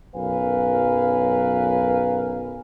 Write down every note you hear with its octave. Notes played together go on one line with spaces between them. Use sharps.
B1 F#2 A#4 B4 F5 G#5